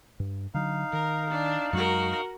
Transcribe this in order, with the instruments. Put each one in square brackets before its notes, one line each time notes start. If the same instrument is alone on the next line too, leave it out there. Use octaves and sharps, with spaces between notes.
[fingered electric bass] G2
[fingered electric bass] D3 F#3 [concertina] D#4 F5
[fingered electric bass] D#3 [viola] A#4
[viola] D4
[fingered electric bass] F#2 F#3 G#3 [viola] F#4 A#4